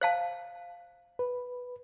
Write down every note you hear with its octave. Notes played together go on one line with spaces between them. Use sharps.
C5 F5 A5
B4